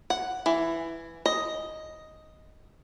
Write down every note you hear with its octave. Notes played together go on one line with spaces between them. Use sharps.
F#5
E3
D#5